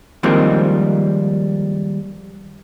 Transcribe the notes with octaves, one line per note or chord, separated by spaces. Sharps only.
D#3 F3 G3 G#3 A#3 C4